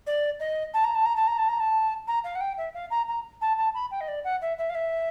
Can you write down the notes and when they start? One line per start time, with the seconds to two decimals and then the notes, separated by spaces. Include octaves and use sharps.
0.07 D5
0.40 D#5
0.74 A5
0.84 A#5
0.95 A5
1.05 A#5
1.16 A5
1.27 A#5
1.38 A5
1.48 A#5
1.60 A5
2.07 A#5
2.24 F5
2.35 F#5
2.41 G5
2.57 E5
2.74 F5
2.90 A#5
3.08 A#5
3.41 A5
3.57 A5
3.74 B5
3.91 G5
4.00 D#5
4.08 D5
4.24 F#5
4.41 E5
4.58 E5
4.69 F5
4.75 E5